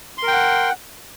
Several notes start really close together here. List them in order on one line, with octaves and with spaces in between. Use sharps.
C6 A#4 G5 F#5